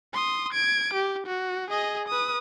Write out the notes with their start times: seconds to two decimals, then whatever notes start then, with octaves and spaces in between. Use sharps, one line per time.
0.13 C6 D#6
0.53 G#6 D7
0.94 G4
1.27 F#4
1.70 G#4 D#5
2.08 B4 D#6